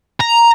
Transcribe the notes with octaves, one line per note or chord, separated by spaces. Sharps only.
A#5